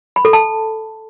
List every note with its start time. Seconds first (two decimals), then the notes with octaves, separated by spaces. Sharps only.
0.16 B5
0.25 A4
0.33 A5